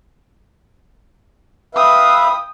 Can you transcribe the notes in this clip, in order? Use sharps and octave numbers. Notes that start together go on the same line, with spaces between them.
B4 E5 F5 G5 D#6